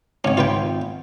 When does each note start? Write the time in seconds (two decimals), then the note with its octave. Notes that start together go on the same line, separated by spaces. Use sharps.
0.24 G#1 C#4 C#5
0.37 F4 B4 G5